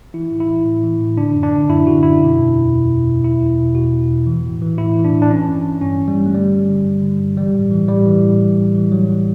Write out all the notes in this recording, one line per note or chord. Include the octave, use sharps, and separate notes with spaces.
E3 E4
A2
E4
E3
A2
E3
A2
D3 D4
F#2
D4
D3
F#2 E4
D3 F#4
F#2 E4
B2
E2
B2
E2
B2
E2
B2 E4
E2
B2
E2 F#4
B2
E2
E3
A2
E3
A2 E4
E3
D4
A2
D4
E3 C#4
G2
E3
G2 C#4
E3
G3
G2
A3
D3 G3
G2
D3
G2
D3
G2
E3 G3
A2
E3
A2 G3
E3
A2
E3
A2
E3
A2 F#3
E3